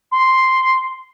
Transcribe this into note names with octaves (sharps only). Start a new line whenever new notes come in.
C6